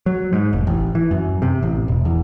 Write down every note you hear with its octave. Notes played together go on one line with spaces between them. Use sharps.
F#3
G#2
F1
A1
E3
F#2
C3
A1
E1
E2